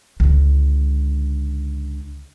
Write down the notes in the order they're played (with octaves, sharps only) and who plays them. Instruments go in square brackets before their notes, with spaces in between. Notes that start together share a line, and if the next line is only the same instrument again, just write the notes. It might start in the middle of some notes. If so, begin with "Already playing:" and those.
[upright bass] C#2 D3